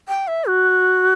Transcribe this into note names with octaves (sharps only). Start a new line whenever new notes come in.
G5
E5
F#4